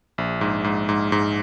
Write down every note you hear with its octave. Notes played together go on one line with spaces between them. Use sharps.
A#1
G#2
G#2
G#2
G#2